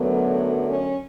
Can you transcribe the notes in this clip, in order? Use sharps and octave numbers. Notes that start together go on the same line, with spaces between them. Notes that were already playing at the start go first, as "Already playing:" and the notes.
Already playing: F#2 D3 F#3 A3 B3
C#4